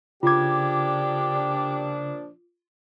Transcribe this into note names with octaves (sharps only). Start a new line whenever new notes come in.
A#2 C#3 F3 D4 F4 G4 D6 G#6